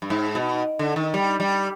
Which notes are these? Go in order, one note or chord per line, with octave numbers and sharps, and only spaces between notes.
G2
G#2
B2
D3
D#3
G3
G3